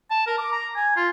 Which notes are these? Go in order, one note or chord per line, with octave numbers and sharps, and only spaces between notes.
A5
A#4
D6
A#5
G#5
F4